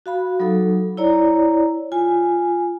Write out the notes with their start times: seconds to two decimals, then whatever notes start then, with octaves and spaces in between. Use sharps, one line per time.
0.06 F#4 F5 B5
0.40 F#3 D#4 A4
0.97 E4 C#5 D5 A#5
1.92 F4 G#5